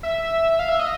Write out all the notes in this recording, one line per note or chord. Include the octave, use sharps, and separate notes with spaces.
E5
F5
E5
D#5